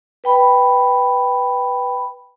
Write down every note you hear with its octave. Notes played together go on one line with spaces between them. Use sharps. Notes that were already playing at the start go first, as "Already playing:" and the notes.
B4 G5 B5